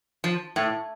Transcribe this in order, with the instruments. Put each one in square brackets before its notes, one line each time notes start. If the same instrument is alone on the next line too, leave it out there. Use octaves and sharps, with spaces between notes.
[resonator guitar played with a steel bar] F3
A2